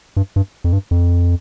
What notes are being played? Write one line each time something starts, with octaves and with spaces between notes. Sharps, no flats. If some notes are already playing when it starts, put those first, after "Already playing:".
G2
G2
F2
G2
F2